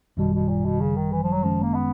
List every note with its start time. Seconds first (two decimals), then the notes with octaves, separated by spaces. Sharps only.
0.17 G#1 F#2 B2 D#3 G3
0.34 B2
0.49 A#2
0.65 B2
0.80 C#3
0.96 D#3
1.12 E3
1.22 F3
1.32 F#3
1.43 G1 F#2 D#3 F3 G#3 C#4
1.62 A#3
1.74 B3